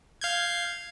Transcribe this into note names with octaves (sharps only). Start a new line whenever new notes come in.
F5 G6 G#6